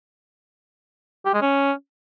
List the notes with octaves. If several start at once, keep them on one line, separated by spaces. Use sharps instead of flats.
G4
G#3
C#4